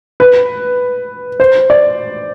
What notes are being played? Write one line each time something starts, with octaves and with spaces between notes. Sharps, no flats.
B4
C5
D5